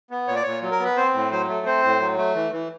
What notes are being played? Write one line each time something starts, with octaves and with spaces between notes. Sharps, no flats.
B3
A#2 C#5
D5
A#2 C#5
F#3
A#4
B3 B4
C4 C5
A2
F#3 C5
A3
C4 C5
A2
F#3
A3
E3
E3